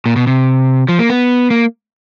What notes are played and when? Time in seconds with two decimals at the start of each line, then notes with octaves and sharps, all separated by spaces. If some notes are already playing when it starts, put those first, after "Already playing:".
0.06 A#2
0.16 B2
0.27 C3
0.89 F3
0.99 A#3
1.10 B3
1.50 A#3